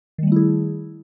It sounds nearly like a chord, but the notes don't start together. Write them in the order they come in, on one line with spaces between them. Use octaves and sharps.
D#3 G3 A3 E4 G#4